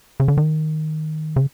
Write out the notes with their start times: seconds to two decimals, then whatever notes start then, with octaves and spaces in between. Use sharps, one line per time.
0.20 C#3
0.28 D3
0.37 D#3
1.36 C#3